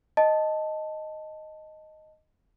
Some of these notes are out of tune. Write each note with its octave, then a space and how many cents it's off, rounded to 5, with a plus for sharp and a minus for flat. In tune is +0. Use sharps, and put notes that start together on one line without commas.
D#5 +0 A5 +0